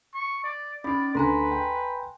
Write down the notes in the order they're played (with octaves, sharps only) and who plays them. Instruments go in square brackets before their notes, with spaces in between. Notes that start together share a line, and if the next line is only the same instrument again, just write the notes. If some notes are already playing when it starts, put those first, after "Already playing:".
[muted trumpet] C#6
D5
[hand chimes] C#4 D#4 [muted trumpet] D5 [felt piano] B5
[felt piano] D2 [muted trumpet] B4 [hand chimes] G#5 A#5 C6
[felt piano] G5